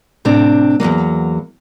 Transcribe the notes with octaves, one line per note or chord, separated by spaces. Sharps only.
A2 C3 C4 D4
E2 G2 F#3 A#3